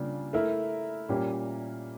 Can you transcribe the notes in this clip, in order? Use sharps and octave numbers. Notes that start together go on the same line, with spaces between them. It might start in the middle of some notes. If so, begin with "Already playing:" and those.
Already playing: C#3 G3 A#3 D4 F4
A3 E4 A#4
A#2 G3 C#4 G4 A#4